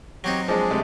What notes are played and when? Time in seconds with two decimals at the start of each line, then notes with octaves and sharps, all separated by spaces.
0.24 F#3 C4 D#4 G4 C#5
0.48 F3 G#3 D4 G#4 D5
0.70 C3 G#3 A3